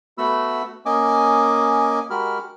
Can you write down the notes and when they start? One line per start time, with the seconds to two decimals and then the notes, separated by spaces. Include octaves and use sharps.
0.18 A3 B3 F#4 B5 E6
0.86 A#3 C#4 D#5 G#5 D6
2.10 G#3 F#4 G4 A#4 B5 F6